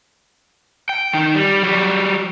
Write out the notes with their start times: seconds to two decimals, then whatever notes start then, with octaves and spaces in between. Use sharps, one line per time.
0.89 G5
1.13 D#3 D#4
1.34 G3
1.63 F#3 G3